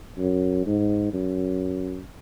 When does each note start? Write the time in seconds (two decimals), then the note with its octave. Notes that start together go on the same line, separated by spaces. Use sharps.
0.18 F#2
0.66 G#2
1.14 F#2